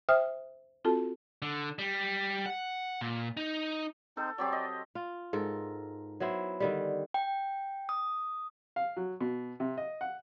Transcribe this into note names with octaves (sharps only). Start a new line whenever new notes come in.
C5 E5 G5 D#6 F6
C4 F4 F#4 A4 A5
D3
G3
F#5
A#2
D#4
C4 D#4 A4 C5
F#3 C4 G4 D5
D#5
F4
G#2 A4 A#4
F#3 B3 E4 C5
D3 D#3 G3
G5
D#6
F5
F#3
B2
C3
D#5
F#5